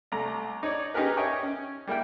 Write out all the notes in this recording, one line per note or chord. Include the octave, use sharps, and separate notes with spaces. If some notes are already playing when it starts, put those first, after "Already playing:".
C2 A3 A#5
D#4 C#5 D5
C#4 D#4 G4 G#4 A#4 B4
C#5 D#5 E5 G5 G#5 C#6
C#4
G3 A#3 E4 G5